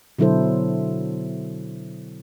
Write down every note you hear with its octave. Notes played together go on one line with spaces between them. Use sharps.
B2 D3 F#3 E4 A4 C5